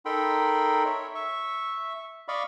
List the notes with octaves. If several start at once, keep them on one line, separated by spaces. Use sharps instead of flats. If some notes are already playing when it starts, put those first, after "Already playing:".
D#4 A4 A#4 G5 B5 C6
C#5 E5
E5 C#6
D5 D#5 F5 B5 C#6